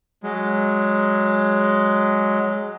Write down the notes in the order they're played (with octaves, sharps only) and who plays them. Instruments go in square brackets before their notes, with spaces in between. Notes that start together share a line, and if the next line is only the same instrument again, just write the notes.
[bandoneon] F#3 G#3